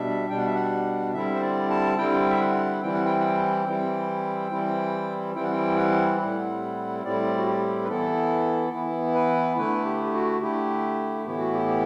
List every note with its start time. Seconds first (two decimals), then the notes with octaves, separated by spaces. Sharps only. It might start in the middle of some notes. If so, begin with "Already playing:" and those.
Already playing: B2 G3 D4 E5
0.29 B2 G3 D4 G5
0.38 F#5
0.46 E5
0.55 F#5
1.14 D3 G3 C4 E4 E5
1.35 C5
1.42 D5
1.70 A5
1.98 D3 G3 C4 E4 G5
2.30 E5
2.40 F#5
2.82 E3 G3 C4 E4 G5
2.93 F#5
3.05 G5
3.20 F#5
3.24 G5
3.67 E3 G3 C4 E4
4.51 E3 G3 C4 E4
5.35 E3 G3 C4 E4 G5
5.44 F#5
5.52 G5
5.77 F#5
6.19 A2 G3 C4 E4 F#5
7.04 A2 G3 C4 E4 D5
7.38 F#4
7.46 G4
7.83 B4
7.88 E3 B3 E4 A4
8.73 E3 B3 E4
9.14 B4
9.57 D3 A3 E4 B4
9.85 G4
10.04 G4
10.13 F#4
10.41 D3 A3 E4 G4
11.25 A2 E3 B3 E4 G4
11.39 F#4
11.52 G4
11.68 G4